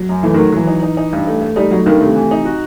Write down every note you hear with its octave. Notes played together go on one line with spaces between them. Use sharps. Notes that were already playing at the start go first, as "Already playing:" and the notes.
Already playing: F#3
F#2
E3 A3
D#3 F#3
E3 F#3
D#4
D#4
D#4
G2
A3
A3
G3 D#4
F#3 A3
G2 D#3
C3 A3
E3
D#4
F#4